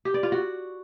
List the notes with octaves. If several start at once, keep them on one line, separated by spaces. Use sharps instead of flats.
G4
D5
F4
F#4